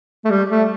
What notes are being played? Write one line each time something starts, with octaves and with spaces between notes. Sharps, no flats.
A3
G3
A3